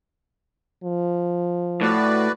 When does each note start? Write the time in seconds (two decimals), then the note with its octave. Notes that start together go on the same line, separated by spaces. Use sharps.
0.84 F3
1.81 A2 F#4 B4 D5